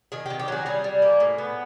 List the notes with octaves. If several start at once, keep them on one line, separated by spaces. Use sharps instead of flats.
D#3 G#4
D#3 G4
G4
F#3 G#4
G3 G#4
G3
A#3
A2
B3